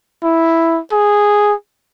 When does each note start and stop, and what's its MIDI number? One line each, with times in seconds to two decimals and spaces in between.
0.23 0.80 64
0.92 1.54 68